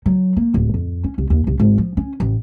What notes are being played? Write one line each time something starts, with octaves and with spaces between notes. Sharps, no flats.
F#3
A#3
D1
F2
C#4
C2
D#2
C2
G#1
F3
C#4
A1